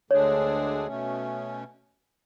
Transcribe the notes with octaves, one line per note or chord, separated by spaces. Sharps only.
D2 D3 G#3 D4 G#4 C#5
B2 A3 C#4